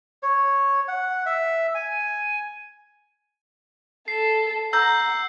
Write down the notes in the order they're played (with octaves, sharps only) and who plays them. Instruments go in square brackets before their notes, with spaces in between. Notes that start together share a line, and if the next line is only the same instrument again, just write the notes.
[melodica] C#5
F#5
E5
G#5
[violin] A4 [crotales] C7
[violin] F#5 [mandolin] A#5 [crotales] E6 G6